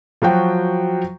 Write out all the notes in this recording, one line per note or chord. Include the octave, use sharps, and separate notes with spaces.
F3 F#3 F#4 G5